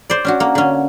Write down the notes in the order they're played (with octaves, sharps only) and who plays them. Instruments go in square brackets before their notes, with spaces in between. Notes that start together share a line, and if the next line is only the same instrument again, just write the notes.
[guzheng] C5 D5
C#4 D4 F#4
A#3
D3 C#4